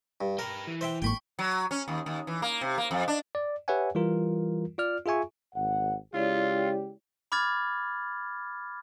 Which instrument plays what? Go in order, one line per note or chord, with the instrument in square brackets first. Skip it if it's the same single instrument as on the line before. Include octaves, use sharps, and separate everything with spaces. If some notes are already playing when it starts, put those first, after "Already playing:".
[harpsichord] G2
[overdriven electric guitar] G4 B4 [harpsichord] A#4
[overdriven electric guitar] E3
[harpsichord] C5 E5 G5
[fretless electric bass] G#1 A2 A#3 [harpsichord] G5 B5 C#6
[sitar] F#3
C#4
D#2
D#2
E3
A#3
C3
A#3
F2
D4
[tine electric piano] D5
G4 B4 C#5 E5 F#5 G#5
E3 G3 F4 A#4
F4 D5 F6
F4 G#4 E5 G#5 C#6
[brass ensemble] G#1 F#5
[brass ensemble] C#3 G#3 G4 [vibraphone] E4 C#5 D5 [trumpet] F4
[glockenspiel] B5 D6 F6 G#6 A6